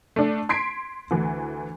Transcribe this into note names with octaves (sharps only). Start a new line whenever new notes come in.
A3 D4
C6 G#6 B6 C7 D7
D2 E3